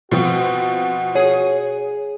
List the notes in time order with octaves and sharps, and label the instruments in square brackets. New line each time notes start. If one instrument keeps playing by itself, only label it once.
[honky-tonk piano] B2 F3 C4 [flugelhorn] F#4
[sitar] G#4 [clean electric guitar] C#5